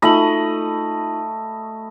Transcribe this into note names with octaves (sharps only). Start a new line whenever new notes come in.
A3 D#4 F4 D#5 B5 F#7